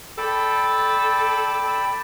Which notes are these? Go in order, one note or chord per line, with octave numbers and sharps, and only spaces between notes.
A4 D5 G5 B5